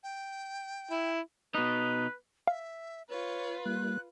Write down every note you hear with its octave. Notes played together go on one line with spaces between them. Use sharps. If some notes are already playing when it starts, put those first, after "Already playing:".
G5
E4
B2 D#4 B4
E5 F5
F4 B4 C#5
G3 A#3 F#6